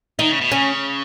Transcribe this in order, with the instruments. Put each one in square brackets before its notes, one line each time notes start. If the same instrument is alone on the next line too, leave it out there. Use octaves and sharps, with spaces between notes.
[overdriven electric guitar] D#3 [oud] D#4
[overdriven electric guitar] C#3
B2
[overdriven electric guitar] C#3 [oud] C#4